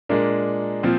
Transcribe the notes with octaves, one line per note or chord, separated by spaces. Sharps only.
A#2 G#3 A#3 D4
A#2 F3 C4